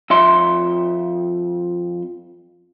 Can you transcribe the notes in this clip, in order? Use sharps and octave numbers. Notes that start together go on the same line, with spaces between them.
F2 E5 C6